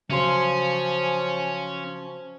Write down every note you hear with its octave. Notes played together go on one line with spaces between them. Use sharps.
C#3 F3 F#3 C#4 G#5 C6